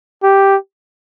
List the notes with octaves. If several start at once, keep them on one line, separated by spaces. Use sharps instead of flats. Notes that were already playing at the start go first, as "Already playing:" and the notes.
G4